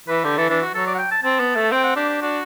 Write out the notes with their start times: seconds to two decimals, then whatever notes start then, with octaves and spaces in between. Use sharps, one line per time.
0.08 E3 B4
0.24 D3 G4
0.37 E3 A4
0.49 E3 D4
0.61 F#4
0.74 F#3 A4
0.87 D5
0.95 F#5
0.99 G5
1.12 A5
1.23 C4 A5
1.40 B3
1.56 A3
1.72 C4 G5
1.84 F#5
1.96 D4 G4
2.09 G4
2.22 D4 F#4